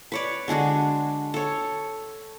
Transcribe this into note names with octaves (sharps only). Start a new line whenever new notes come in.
B4 C#5 D5
D3 G#3 D4 F#4
A4 C#5